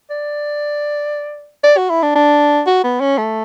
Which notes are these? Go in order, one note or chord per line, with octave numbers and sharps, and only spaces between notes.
D5
D5
F#4
E4
D4
D4
F#4
B3
C#4
A3